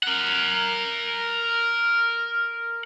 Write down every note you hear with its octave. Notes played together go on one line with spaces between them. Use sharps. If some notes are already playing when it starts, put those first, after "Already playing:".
A#4 F#5